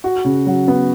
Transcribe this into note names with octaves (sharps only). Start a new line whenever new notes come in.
F#4
C#3
F#3
B3